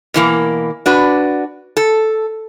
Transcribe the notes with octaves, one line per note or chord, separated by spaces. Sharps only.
B2 E3 A#3
D4 F#4 B4
A4